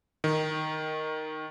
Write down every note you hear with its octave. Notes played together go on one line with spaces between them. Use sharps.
D#3